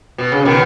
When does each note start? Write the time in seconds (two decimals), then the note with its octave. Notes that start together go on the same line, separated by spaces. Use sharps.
0.18 B2
0.32 C#3
0.45 B2 D#3